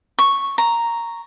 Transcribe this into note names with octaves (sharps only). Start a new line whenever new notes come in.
C#6
A#5